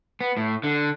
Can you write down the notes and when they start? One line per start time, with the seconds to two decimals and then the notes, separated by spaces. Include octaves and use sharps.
0.21 B3
0.37 A2
0.64 D3